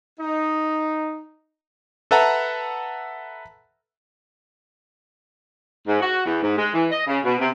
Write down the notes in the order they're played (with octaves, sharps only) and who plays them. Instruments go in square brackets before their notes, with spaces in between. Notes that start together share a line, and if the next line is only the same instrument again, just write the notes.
[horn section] D#4
[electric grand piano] A4 B4 E5 F#5 A5 A#5
[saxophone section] G#2
F#4
E2
G#2
G#3
E3
D#5
C#3
B2
C3